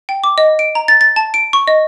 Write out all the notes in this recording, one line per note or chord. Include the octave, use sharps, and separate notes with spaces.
G5
D6
D#5
D7
A#5
A6
A6
A5
D7
C#6
D#5